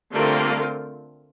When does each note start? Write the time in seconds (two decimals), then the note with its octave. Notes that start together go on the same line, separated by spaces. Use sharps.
0.14 D3 G3 A3 A#3 C4 F4 A#4
0.37 G3 A#3